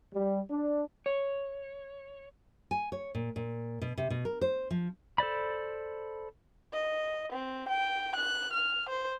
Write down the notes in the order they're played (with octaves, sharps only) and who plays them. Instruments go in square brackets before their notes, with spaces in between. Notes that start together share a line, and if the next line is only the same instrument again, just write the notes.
[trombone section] G3
D4
[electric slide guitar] C#5
[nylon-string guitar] G#5
C#5
A#2
A#2
B2
C3
B2
A#4
C5
F3
[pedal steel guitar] A4 C5 D5 B5
[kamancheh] D#5
C4
G5
F#6
F6
C5